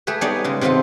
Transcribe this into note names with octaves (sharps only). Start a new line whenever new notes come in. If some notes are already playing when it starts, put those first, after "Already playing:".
A3 G4 G#4 B4
G3 B3 D#4 G#4 C#5 D5
C#3 G#3
C3 D#3 B3 C4 F4 A4